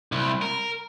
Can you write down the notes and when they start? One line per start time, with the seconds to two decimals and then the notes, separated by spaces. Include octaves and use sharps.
0.12 C2
0.42 A#4